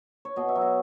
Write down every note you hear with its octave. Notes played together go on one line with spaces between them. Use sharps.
C#5
B2 D#5
E5
F#3
D#5